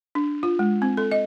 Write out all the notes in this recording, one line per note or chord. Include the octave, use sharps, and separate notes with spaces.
D4
F4
G#3
C4
A4
D#5